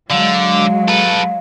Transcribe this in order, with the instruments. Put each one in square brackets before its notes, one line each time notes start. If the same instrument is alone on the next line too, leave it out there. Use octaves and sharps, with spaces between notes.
[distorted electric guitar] D3 [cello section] F#3 G#3 [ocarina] F5
[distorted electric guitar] A4 B4